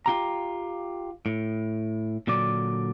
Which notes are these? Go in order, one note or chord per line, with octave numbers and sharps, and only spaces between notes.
F4 G4 A#5
A2
A#2 D3 F#3 D5